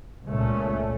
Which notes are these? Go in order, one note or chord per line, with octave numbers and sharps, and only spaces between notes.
C#2 A#2 A3 C#4